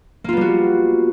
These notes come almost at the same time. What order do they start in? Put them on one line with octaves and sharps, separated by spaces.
A#3 F4 B3 G3 F#4